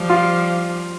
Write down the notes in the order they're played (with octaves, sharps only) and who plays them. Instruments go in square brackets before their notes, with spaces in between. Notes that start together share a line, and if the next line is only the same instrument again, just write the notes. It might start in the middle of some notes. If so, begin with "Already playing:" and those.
Already playing: [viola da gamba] F3 G3
[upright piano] F4